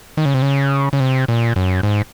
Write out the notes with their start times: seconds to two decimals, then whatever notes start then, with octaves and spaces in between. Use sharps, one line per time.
0.17 D#3
0.25 C#3
0.34 C3
0.42 C#3
0.93 C#3
1.00 C3
1.28 A#2
1.56 F#2
1.83 G#2